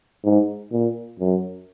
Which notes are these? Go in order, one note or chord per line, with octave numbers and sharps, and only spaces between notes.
G#2
A#2
F#2